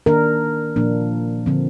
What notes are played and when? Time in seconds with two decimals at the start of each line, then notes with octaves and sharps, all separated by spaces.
0.06 D#3 A#3 D4 A#4
0.76 A#2 F3 A#3 D4
1.46 D3 F3 C4